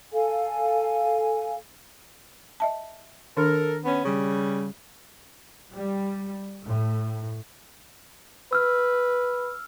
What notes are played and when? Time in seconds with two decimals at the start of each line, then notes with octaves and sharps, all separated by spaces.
0.12 A4 F5 G#5
2.60 D#5 E5 A5
3.37 D#3 D4 A4 A#4
3.85 B3 C#4
4.05 C#3 G3
5.73 G3
6.66 A2
8.53 B4 E6 F6